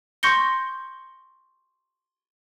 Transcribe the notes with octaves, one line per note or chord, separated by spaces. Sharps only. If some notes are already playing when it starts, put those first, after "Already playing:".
C6 C#6 G6 A#6 C#7 G7